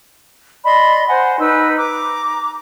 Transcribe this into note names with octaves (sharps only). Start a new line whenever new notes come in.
D5 D#5 B5 C6
C5 F#5 G#5
D#4 B4 E6
A#5 D6